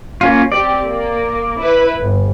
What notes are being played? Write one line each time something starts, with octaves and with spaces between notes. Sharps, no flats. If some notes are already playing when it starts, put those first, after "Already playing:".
A#3 C#4 F4
C4 G4 D5
A#3
E4 B4
G1